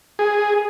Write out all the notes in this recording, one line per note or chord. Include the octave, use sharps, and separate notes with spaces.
G#4